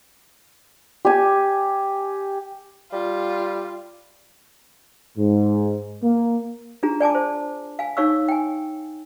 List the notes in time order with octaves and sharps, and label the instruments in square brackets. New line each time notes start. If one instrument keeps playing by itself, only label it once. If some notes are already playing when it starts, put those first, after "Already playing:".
[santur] G4 G#5
[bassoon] G3 [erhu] F4
[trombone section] G#2
A#3
[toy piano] D4 F4 G#4 A#5
D5 G#5 A5 D6
C5
F5 G#5
D#4 C#5 F5 C#6 E6
G5 G#5